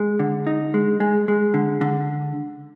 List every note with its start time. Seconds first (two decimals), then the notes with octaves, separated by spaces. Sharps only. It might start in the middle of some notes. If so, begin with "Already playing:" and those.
Already playing: G#3
0.19 D3
0.47 D#4
0.74 G#3
1.00 G#3
1.28 G#3
1.54 D3
1.81 D3